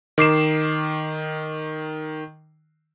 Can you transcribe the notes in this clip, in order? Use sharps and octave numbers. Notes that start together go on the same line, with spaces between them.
D#3 D6 C7 E7